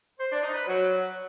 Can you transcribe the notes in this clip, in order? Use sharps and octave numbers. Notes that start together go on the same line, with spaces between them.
C5
D4
D#4
B4
F#3